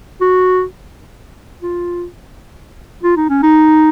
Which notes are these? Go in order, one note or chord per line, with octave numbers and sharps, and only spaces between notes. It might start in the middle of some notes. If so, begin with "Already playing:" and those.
F#4
F4
F4
D#4
C#4
D#4